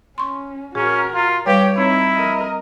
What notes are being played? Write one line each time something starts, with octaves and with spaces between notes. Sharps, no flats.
C#4 C6 C#6
A#2 C#4 F#4 G#4 A#4
F4
G3 G4 B4 C#5 F5
C4 D#4 E4
A#4 D#5